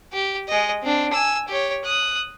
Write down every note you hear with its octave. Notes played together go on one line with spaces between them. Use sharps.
G4
G#3 D#5
C4 D4
G#5 E6
G4 C#5
D#6 F#6